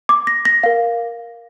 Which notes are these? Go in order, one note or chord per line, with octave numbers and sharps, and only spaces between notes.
D6
A#6
A#6
A#4 F5